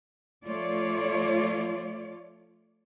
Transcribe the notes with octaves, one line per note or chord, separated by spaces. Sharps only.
F3 A3 F4 C#5 D5